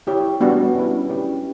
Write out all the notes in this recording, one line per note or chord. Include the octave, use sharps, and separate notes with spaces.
E4 G4 C#5
G3 B3 D4 F#4 B4
C#4 E4 B4
C#4 E4 G4 B4 D5